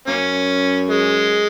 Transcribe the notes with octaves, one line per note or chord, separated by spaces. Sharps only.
F#2 A#3 C#4
G#3